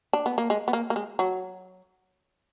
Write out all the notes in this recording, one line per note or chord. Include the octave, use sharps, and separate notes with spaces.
D4
B3
A#3
G#3
B3
A#3
A#3
G#3
F#3